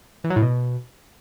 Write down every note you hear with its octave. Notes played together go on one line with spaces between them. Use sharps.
E3
F#3
A2
B2